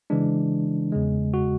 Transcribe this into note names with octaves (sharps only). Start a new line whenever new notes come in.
C#3 E3 G#3 D4
E2 C#3 G#3
F#4